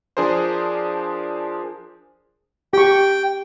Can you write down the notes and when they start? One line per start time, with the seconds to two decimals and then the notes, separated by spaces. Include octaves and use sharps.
0.17 F3 D4 G#4 A#4 C5
2.73 G4 G5 C#6